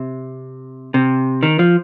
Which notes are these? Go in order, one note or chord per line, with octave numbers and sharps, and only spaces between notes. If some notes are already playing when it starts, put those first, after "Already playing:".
Already playing: C3
C3
D#3
F3